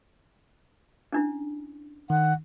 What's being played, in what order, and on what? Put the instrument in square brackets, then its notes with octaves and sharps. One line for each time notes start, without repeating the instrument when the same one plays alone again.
[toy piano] C#4 D4 E4
[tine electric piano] D#3 [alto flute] F#5